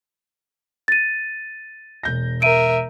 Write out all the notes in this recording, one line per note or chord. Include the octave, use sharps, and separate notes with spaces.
A6 D#7
E1 G6 A#6
A#4 E5 D7 D#7